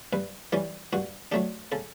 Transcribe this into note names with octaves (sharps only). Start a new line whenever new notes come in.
G2 B4
E3 G3 C#4 G4
G2 F#4
F#3 A3 D4 G4
C#3 A4